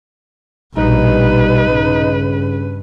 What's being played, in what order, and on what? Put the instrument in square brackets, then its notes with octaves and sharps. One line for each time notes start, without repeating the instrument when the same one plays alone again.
[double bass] A#1 B2 [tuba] G3 [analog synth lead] D#4 [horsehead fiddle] B4
[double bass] G2 [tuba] C#3